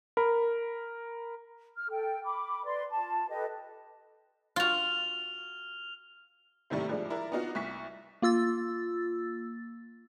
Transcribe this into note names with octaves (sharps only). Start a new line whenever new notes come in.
A#4 B5
F6
A4 G5
B5 D6
B4 D5 C6
F4 A5
G4 A4 B4 D#5
F4 F#4 F6 F7
A2 C3 D#3 G3 A3
F3 G3 G#3 D4
E4 A#4 D5
B3 D4 D#4 F4 F#4
C2 C#6 B6
A#3 F4 E6 A6